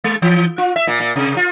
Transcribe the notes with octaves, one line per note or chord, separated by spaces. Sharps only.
G#3
E3
F4
E5
A#2
A#2
C3
F4